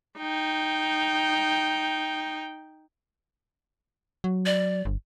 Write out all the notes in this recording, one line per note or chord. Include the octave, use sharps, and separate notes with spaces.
D#4 G5
F#3
D5
G1